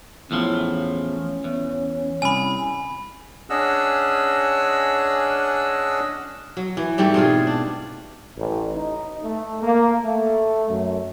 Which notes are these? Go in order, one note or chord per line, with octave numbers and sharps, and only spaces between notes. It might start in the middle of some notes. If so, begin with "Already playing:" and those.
E2 A2 F3 C#4
E2
C2 G#5 B5
C#4 D4 G#4 D#5 F#5 E6
F#3
E3
G#2 G3 A3 C4
B2 C4 F4 G#4
D4
A1
D#4
A3
A#3
A3
F#2